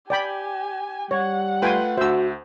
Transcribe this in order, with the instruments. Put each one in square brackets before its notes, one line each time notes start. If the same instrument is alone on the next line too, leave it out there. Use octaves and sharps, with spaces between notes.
[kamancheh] G4 G#5 [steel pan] D5 G5 B5
[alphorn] G3 [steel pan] C#5 [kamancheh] F#5
[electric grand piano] A3 F4 B4 [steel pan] G5 G#5 C6
[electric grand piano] D2 E5 [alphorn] F#4 [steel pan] C5 E6